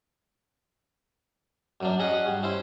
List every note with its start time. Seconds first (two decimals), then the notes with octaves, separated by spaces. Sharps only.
1.81 F#2 F#3 D4
1.99 C#4 F#4 G#4 D#5 F#5
2.26 G2
2.43 C#4 E4 C5